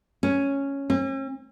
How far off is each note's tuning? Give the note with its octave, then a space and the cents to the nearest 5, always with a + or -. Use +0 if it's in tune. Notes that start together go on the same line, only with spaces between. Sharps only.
C#4 +0
C#4 -45